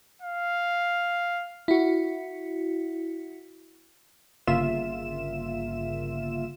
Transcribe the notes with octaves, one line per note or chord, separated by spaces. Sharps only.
F5
E4 F#4
G1 C#3 A#3 F4 E5 E7